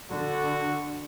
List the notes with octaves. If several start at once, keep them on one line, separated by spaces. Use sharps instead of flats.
D3 F#4